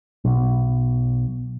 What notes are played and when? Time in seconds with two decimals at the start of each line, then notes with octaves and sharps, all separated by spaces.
0.25 B1